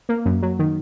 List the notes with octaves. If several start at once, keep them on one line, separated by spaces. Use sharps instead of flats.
A#3
F#2
F#3
D#3